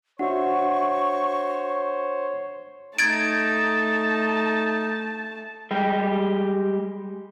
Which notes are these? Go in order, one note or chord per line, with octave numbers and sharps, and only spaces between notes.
D4 F#4 C5 C#5 E5 F#5 C#6
A3 D#4 A5 G#6 A6 D7
G3 G#3 G4